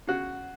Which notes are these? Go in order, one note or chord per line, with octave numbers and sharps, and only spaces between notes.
C#3 F#4